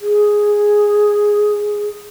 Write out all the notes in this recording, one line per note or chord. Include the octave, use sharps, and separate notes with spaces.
G#4